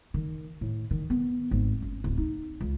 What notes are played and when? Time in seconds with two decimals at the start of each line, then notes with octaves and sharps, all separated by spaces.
0.14 D#3
0.61 A2
0.91 D#3
1.10 B3
1.51 G#1
1.82 C#4
2.04 D1
2.18 D#4
2.61 C#2